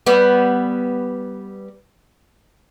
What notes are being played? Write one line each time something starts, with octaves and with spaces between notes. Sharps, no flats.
G3 B3